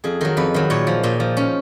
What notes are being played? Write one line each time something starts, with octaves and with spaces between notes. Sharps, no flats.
F2 G#4
D#3 F#3 A#4
F2 B4
D#3 F#3
A#2 C#5
F3
A#2 D#4
F3
C#4